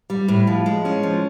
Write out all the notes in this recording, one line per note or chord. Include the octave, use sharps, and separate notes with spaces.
G3
A2
F3
G#3
C#4
F3